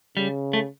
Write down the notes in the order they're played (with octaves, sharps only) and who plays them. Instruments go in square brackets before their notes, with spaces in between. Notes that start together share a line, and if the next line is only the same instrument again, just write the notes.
[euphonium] C#3 [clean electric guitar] G3
[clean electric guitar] A3